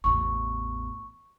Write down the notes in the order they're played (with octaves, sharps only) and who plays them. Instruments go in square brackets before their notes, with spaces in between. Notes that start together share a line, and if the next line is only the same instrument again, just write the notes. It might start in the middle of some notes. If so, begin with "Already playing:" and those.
[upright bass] A1 E2 [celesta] C#6